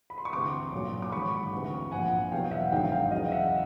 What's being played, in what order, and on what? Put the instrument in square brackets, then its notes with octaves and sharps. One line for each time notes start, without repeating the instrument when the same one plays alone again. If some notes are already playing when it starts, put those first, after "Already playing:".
[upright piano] B5
C6
C#6
D2 C3 E3 C6 D6
B1 A#2 F#3
D6
A1 G#2 D#3 F#3 B5 C#6
D2 C3 E3
A#1 A#2 F3 F#5 G#5
E2 B2 F#3 F5 G5
E5 F#5
A#1 G#2 D#3 F#3 F5 G5
F5 G5
E2 C#3 F#3 D#5 F5
E5 F#5